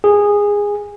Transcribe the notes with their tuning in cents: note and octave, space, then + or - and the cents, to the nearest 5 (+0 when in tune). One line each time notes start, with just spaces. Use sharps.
G#4 -15